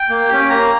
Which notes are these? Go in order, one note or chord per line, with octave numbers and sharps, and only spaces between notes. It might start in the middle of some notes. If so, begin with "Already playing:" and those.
Already playing: G5
A#3
C#4 G4
A#3 A#5